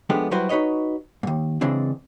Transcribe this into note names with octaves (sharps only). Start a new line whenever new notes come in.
F3 G#3 A3 B3 D4 G4
F#3 G3 E4 F#4 B4 C5
D#4 F#4 B4 C#5 D#5
D#2 G#2
C#3 E3 G#3 C4 D4